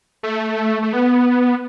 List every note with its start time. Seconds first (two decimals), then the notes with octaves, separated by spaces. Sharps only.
0.23 A3
0.82 A3
0.93 B3